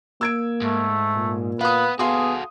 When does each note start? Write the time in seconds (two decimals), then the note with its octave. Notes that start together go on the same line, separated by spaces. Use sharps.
0.21 A#3 E6 G#6 D7
0.62 G#2 A3
1.16 A#2
1.61 B3 B4 F5 D#6
1.99 B3 F#4 G#4 A4 F5 C6 D#6